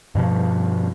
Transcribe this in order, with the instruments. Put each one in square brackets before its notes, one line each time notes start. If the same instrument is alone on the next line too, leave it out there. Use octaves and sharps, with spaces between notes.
[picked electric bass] G2 B2 F3